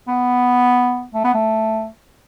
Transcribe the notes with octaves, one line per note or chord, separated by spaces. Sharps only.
B3
A3
B3
A3